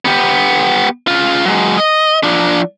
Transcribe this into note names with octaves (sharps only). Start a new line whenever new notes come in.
B3 G4
C#3 F4
F#3 G#3
D#5
F3 D4